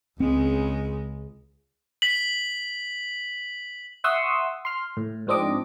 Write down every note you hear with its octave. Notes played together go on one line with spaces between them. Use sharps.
C#2 C#3 G#3 C4
B6 F#7
E5 F#5 C6 C#6 D#6 E6
C6 F6
A2
G#2 F3 C4 D4 D#5 D6